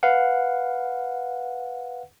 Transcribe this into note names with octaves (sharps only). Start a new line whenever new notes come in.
B4 F5 F#5